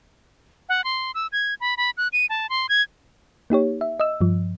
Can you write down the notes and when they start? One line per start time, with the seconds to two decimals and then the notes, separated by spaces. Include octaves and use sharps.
0.69 F#5
0.84 C6
1.15 E6
1.32 G#6
1.60 B5
1.77 B5
1.97 F#6
2.13 D#7
2.29 A5
2.50 C6
2.69 G#6
3.50 A#3 D#4 G4 C#5
3.81 E5
4.00 D#5 E6
4.21 G2 F3